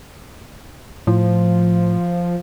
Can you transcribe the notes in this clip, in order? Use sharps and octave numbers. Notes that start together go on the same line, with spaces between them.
A2 F3